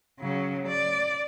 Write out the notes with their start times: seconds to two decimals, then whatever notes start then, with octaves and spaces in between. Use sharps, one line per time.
0.20 C#3 F#3
0.68 D5